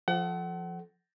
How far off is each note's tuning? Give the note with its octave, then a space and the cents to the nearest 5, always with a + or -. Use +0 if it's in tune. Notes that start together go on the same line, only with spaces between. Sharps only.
F3 +0 A4 -20 F#5 +35